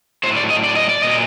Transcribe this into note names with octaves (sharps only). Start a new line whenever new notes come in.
A2 F#3 C5
D5
D#5
D5
D#5
D5
A#2 F#3 D#5